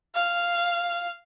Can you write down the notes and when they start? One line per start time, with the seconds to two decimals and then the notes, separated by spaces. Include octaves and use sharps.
0.15 F5